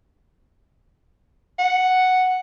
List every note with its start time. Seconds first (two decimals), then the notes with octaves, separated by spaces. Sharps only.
1.59 F#5